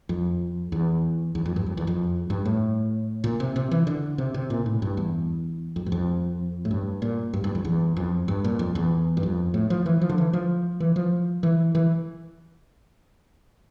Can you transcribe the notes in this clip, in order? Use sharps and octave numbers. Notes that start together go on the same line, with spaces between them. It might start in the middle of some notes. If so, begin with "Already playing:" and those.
F2
E2
E2
F2
G2
F2
E2
F2
G2
A2
A#2
C3
C3
E3
D3
C3
C3
A#2
A2
G2
E2
F2
G2
F2
A2
G2
A#2
G2
G2
F2
E2
F2
G2
A#2
F2
E2
G2
F2
A2
F3
E3
F3
D3
E3
F3
E3
F3
E3
E3